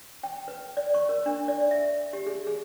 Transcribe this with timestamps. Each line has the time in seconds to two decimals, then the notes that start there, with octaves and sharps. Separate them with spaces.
0.23 G5
0.48 B4
0.77 D5
0.94 C#6
1.09 A#4
1.26 D4
1.48 D5
1.71 E5
2.13 G4
2.27 G#4
2.47 G#4